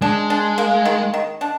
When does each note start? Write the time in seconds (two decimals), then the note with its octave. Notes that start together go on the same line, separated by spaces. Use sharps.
0.01 G#3 D4
0.30 D4
0.58 A#3
0.85 D#3
1.14 D#3
1.41 D4